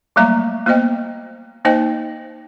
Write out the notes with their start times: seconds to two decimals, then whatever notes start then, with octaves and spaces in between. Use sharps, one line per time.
0.16 F#3 G3 A3 A#3 E5 A#5
0.66 A#3 B3 C5 D#5 G5
1.65 A#3 D#4 C5 D#5 G5